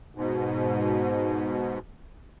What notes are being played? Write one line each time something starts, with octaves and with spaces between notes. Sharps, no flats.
G#2 B2